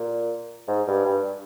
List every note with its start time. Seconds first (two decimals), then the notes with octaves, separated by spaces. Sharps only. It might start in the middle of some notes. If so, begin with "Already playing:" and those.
Already playing: A#2
0.68 G#2
0.87 G2
1.05 G2